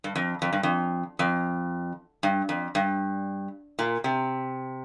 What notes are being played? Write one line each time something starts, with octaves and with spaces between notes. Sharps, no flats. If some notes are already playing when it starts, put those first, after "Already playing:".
G2
F2
F2
G2
F2
F2
G2
F2
G2
A#2
C3